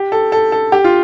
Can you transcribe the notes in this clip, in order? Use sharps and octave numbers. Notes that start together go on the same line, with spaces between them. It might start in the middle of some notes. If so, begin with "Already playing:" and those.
Already playing: G4
A4
A4
A4
G4
F4